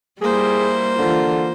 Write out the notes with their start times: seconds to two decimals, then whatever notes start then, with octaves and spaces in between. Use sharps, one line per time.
0.21 G3 A#3 E4 G#4 C5
0.99 D3 E3 F4